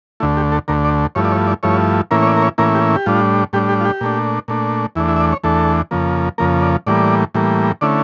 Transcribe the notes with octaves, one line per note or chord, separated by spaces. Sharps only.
D2 D3 A3 E4
G4
A4
D2 D3 A3 A#4
D5
G2 F3 A3 E4 C#5
D5
C#5
D5
G2 F3 A3 E4 C#5
A2 E3 A#3 C#4 E4 A#4
C#5
D5
A#4
C#5
A2 E3 A#3 C#4 E4 A#4
G4
G4
A2 G3 D4 F4
A2 G3 D4 G4
G4
F4
G4
A#2 A3 D4
A#2 A3 D4
E2 E3 A3 D4 E4
E4
E5
D5
C#5
E2 E3 A3 D4 A4
F2 C#3 F3 A#3
F2 C#3 F3 A#3 A#4
D5
A2 E3 G3 A#3 D5
A2 E3 G3 A#3
D3 A3 C#4 E4 D5